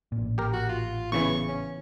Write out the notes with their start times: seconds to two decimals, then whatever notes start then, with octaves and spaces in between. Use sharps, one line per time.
0.12 A1 A#2
0.38 G4 A#4
0.54 F#4
0.69 F4
1.12 E2 C#3 E3 C#6
1.48 C#4